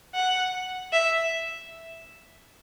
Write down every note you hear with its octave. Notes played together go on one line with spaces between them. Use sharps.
F#5
E5